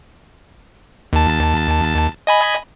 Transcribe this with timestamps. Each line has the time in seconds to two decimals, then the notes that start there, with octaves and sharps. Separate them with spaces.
1.13 D#2 A5
2.27 D#5 G#5 B5